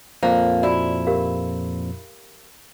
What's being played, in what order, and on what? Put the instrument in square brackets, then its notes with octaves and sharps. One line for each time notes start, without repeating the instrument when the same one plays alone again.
[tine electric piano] F2 A#2 F3 [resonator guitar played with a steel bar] A#3 [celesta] C5
[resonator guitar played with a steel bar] E4 [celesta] F#4 D5
[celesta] G4 A#4 F5